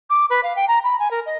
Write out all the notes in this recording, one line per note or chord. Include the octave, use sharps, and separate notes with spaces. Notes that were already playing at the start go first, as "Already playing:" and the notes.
D6
B4
F5
G5
A#5
B5
G#5
A#4
D#5